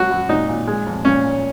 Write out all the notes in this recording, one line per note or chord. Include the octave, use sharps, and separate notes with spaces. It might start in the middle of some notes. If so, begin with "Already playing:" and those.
Already playing: F#3 F#4
F#2
A#2 D#4
A#2
G#3
F2
A#2 C#4
A#2